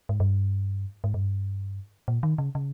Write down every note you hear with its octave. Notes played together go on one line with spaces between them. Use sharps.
G#2
G2
G#2
G2
A#2
D#3
C#3
C#3